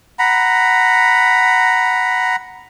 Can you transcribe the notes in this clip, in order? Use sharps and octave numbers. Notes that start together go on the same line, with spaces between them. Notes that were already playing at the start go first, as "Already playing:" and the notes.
F#5 A#5 B5